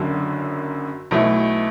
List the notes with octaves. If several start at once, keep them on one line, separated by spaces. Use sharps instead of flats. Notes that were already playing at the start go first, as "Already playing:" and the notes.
Already playing: F#1 F#2 D3 F#3
B1 B2 A3 E4